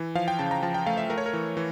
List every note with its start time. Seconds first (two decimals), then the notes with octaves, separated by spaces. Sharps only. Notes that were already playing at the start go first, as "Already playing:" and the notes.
Already playing: E3
0.15 F3 F5
0.28 G5
0.39 C#3 A5
0.51 A#5
0.63 F3 A5
0.74 G5
0.86 A3 F5
0.97 E5
1.10 A3 A#4
1.18 C#5
1.26 A#4
1.33 E3
1.57 E3